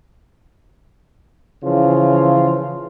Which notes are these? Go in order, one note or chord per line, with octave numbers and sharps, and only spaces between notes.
C#3 E3 F3 F4